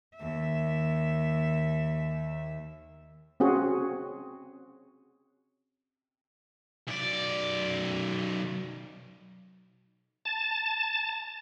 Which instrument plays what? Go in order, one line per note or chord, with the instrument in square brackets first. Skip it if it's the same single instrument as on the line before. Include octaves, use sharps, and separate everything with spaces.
[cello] D#2 E5
[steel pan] C4 C#4 F#4 G#4
[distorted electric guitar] B1 D5
[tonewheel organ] A5